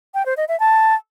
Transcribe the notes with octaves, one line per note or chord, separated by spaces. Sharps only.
G5
C5
D#5
E5
A5